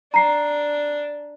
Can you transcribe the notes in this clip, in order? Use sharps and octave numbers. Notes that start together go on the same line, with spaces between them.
D4 A#5 C7